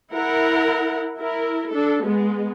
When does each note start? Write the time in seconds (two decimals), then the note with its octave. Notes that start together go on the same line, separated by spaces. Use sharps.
0.11 E4 A#4 F#5
1.18 E4 A#4
1.72 D4 A4
2.04 G#3 B3